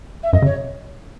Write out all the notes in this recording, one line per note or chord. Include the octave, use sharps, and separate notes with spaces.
E5
F#2 D#5
C#3
C#5